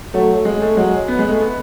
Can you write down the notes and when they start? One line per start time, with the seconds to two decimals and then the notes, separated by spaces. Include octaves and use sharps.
0.14 F#3 A3
0.45 G#3
0.61 A3
0.77 F#3 G#3
1.08 B3
1.19 G#3
1.29 A3
1.40 B3